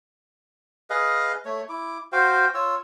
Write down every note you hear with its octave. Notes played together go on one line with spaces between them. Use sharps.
G#4 B4 D#5 F5
A3 C#5
E4 D6
F#4 C5 F5 G5
F4 C#5 E6